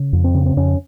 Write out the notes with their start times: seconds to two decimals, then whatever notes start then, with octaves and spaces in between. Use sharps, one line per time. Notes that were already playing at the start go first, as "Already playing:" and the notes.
Already playing: C#3
0.13 F2
0.24 C4
0.35 C#3
0.46 C4
0.57 F2 C#4